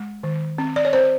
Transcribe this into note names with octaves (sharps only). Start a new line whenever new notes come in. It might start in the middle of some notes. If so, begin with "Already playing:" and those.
Already playing: G#3
D#3
C4
D5
C#5
C4 C5